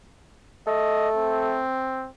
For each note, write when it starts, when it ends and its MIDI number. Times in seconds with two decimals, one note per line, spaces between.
0.67 1.61 57
0.67 1.08 75
1.16 2.09 60